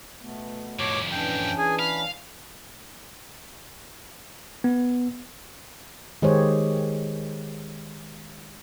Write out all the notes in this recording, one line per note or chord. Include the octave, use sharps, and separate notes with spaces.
B2 A3 B3
F2 A2 C#5 D6
E3 C#4 D4 G5
G#4 G#5
F5 B5
B3
D#3 G#3 G4 G#4 C5 C#5